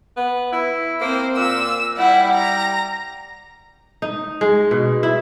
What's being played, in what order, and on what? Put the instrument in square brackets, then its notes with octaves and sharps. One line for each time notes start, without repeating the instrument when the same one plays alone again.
[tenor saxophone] B3
E4
[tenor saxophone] A#3 [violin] C4 C5
[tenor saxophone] A#2 [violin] E6
[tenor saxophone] G3 [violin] E4 F#5
[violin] A#5
[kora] D#4
G#3
B2
E4